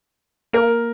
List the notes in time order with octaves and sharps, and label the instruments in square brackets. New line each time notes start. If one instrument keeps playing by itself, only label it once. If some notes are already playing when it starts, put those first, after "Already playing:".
[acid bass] A#3 [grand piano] A#4